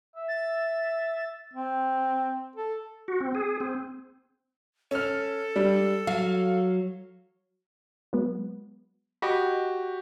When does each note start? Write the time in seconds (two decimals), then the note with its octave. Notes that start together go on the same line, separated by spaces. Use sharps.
0.16 E5
0.28 A6
1.54 C4
2.56 A4
3.08 F#4
3.20 C4
3.35 G#4
3.60 C4
4.91 C#4 A4 F6
5.56 G3 D4
6.07 F#3 F5
8.13 F#3 G#3 B3
9.22 F#4 G4 D#5 B5